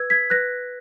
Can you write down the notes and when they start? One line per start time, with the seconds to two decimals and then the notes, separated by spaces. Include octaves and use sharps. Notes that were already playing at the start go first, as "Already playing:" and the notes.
Already playing: B4 E6 G#6
0.10 G#6 B6
0.30 B4 F#6 A#6